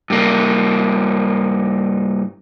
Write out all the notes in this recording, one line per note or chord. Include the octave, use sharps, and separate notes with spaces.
G2 A#3